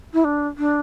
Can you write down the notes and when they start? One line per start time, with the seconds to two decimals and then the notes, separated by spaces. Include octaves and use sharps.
0.13 E4
0.24 D4
0.58 D4